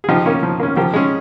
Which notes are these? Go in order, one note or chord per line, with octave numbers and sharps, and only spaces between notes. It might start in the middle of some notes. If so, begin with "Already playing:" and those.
G#4
F3 D#4 G4
A#3 C#4
F3
A#3 C#4
F3 G4 A#4
G#3 C#4